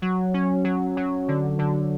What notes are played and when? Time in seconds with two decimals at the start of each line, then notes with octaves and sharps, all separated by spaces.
0.02 F#3
0.34 C#4
0.64 F#3
0.97 F#3
1.28 D3
1.59 D3